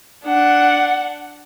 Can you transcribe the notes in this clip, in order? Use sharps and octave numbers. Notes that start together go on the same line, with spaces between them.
D4 F#5